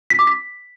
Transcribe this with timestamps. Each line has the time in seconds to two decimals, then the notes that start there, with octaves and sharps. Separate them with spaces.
0.10 B6
0.19 D6
0.27 B6